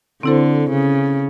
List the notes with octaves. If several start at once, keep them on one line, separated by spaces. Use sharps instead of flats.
D3 C4 E4 A4 C5
C#3